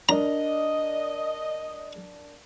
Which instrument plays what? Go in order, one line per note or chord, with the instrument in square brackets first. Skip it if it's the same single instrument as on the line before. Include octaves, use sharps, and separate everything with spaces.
[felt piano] D4 A#4 D5 [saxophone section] D#5 [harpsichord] A#5